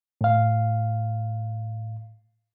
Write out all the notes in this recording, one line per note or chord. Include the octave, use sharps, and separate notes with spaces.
A2 F5